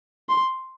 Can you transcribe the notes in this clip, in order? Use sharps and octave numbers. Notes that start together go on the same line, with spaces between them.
C6